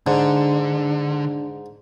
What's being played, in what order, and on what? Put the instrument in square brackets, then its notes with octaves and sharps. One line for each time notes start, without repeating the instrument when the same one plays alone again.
[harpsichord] G#2 [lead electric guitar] D3 [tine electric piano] D4